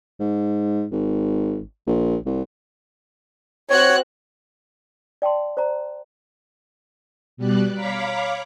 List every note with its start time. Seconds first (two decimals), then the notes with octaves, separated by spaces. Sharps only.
0.20 G#2
0.92 G#1
1.87 A#1
2.26 C2
3.70 C4 F#4 C#5 F#6
5.22 D5 G5 A5 C6
5.57 C5 D5 A#5
7.37 B2 G3 D5 F#6
7.73 C#5 F5 A#5 B5 D6 B6